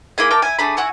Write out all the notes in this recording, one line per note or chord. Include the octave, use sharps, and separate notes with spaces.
A#3 E4 G#4 G#5
A#4 G5 A5 D6
E4 G#5
A3 D4 G#4 B5
E4 F#4 G#5 C#6